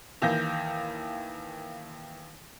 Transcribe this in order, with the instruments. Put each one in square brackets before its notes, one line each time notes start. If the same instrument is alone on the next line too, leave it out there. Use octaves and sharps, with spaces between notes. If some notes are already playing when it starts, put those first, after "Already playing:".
[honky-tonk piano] D#2 E3 A#3 G6 A#6